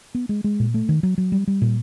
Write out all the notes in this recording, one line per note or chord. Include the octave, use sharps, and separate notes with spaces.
B3
G#3
G#3
A#2
A3
D#3
F#3
F#3
G3
G3
A#2